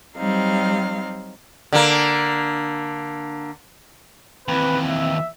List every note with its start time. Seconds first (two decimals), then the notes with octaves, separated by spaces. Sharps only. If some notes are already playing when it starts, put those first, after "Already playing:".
0.18 F#3 G3 C4 D#4 F5
1.73 D3 A#3
4.48 D#2 E3 C4 B4
4.89 E5